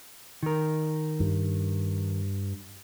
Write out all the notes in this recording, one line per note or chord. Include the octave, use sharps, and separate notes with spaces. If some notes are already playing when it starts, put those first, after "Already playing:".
D#3 A#4
G2